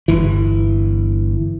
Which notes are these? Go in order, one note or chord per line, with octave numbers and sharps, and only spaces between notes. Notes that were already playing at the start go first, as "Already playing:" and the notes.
G1 E3